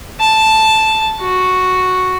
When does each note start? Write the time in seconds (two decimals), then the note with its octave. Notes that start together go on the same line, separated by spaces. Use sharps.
0.20 A5
1.21 F#4